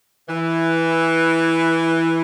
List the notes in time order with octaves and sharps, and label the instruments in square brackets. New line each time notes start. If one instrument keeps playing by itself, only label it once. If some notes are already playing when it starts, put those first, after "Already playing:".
[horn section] E3